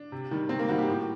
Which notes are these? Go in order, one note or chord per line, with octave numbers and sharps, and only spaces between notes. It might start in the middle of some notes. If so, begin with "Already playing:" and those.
Already playing: D4
C3
D#3 G3
C3 C4
A#3
D#3 G3 F#4
G4
A2